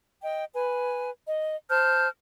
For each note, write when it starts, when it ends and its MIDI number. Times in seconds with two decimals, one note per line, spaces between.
0.22 0.44 75
0.22 0.44 79
0.54 1.10 71
0.54 1.10 80
1.27 1.55 75
1.70 2.08 72
1.70 2.08 81
1.70 2.08 89
1.70 2.08 91